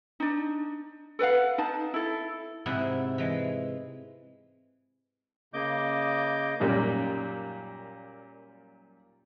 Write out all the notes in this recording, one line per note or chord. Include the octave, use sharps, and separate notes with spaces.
D4 D#4
A4 B4 F5 F#5
D#4 A5
E4 A4
G#2 C3 E4 G#4 F#5
E3 G#3
C#3 A#3 D#5 D6 G6
F#2 A#2 G3 A#3 C#4 D#4